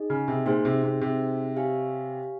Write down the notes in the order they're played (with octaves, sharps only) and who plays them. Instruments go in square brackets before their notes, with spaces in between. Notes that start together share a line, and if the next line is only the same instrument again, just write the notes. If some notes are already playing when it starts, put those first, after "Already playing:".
Already playing: [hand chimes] D#4 G#4 D#5
[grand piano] C#3
C3
[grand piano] A#2 [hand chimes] D#4 G#4 C5
[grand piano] C3
C3
C3
[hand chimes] G4 C#5 F5 G#5